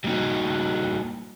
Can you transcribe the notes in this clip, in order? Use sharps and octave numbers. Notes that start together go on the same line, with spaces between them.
F#3 G3 A#3 D#4 F#4